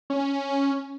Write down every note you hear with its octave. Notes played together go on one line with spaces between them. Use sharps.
C#4